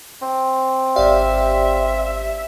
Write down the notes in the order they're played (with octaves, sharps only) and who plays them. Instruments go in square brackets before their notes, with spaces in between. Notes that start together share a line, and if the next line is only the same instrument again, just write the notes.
[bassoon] C4
[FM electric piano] G#1 G4 [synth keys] D5 F5 [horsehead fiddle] E5